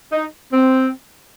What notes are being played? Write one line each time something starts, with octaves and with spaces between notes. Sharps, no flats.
D#4
C4